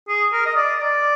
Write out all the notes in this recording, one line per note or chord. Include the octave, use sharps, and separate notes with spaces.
G#4
A#4
D#5
D5
D5